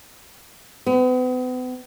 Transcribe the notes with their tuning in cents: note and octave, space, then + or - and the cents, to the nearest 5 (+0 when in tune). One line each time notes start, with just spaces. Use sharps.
B3 +40